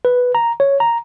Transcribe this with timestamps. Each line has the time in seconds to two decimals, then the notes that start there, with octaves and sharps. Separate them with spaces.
0.05 B4
0.35 A#5
0.60 C#5
0.80 A#5